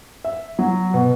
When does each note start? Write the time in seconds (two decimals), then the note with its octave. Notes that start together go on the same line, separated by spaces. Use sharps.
0.25 E5
0.59 F#3
0.94 B2